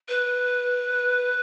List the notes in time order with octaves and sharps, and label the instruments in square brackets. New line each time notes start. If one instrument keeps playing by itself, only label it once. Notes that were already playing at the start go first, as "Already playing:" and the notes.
[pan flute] B4